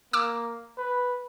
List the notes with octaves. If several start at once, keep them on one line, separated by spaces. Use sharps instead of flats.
A#3 D6 E6
B4